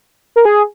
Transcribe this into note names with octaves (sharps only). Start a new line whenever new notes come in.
A#4
G#4